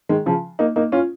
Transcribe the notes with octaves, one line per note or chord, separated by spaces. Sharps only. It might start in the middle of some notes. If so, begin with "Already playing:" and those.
D#3 G#3
C#3 F3
A#3 D#4
A#3 D#4
C#4 F4